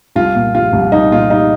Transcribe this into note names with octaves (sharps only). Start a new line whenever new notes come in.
C2 F4
A#2
G3 F4
C2
C2 D#4
A#2 F4
G3 D#4